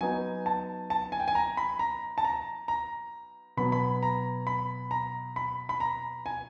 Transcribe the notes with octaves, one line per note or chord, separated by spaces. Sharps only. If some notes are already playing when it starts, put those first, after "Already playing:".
F#3 B3 D#4 G#5
A5
A5
G#5
G5
G#5
A#5
B5
A#5
A5
A#5
A#5
B2 F#3 B3 B5
B5
A#5
B5
A#5
B5
B5
A#5
G#5